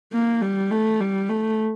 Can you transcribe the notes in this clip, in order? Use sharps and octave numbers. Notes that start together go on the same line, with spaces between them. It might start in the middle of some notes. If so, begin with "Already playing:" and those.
A#3
G3
A3
G3
A3